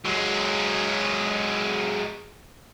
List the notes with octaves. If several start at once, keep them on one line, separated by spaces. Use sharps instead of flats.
F#3 G#3